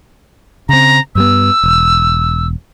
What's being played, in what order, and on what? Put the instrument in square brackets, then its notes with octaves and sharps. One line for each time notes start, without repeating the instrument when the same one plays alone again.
[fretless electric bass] C#3 C4 [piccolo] A#5
[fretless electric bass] G2 G3 B3 [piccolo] E6
[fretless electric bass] E1